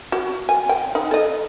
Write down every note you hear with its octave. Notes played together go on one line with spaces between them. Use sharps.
F#4
G#5
G5
D#4
A4 D#5